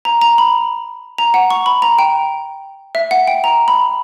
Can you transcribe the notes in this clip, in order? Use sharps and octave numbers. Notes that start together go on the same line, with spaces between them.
A#5
A#5
B5
A#5
F#5
C#6
B5
A#5
G5
E5
F#5
G5
A#5
B5